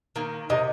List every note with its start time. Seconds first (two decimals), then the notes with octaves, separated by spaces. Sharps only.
0.16 D#3 A#3
0.50 C3 D#5